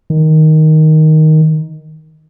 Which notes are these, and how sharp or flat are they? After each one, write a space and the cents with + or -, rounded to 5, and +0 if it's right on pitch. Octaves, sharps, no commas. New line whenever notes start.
D#3 +5